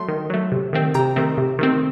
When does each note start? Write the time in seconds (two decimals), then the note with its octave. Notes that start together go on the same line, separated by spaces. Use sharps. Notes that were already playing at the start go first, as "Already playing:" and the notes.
Already playing: F#3 A3 C6
0.08 D#3
0.30 F#3 A3
0.52 C3
0.73 D#3 A3 C4
0.94 C3 G5 A#5
1.16 D#3 A3 C4
1.38 C3
1.59 D#3 A3 C4